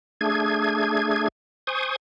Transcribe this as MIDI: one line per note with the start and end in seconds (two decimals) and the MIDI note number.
0.21 1.28 57
0.21 1.28 62
0.21 1.28 68
0.21 1.28 92
1.67 1.96 72
1.67 1.96 80
1.67 1.96 85
1.67 1.96 87